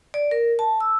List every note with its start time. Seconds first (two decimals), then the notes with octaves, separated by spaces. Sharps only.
0.14 D5
0.31 A#4
0.59 A5
0.80 E6